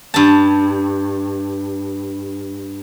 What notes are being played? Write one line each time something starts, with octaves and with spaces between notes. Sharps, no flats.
G2 A5